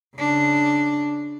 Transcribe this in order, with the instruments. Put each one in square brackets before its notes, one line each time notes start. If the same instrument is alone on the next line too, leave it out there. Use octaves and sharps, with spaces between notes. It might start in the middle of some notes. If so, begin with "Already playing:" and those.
[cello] C#3 D4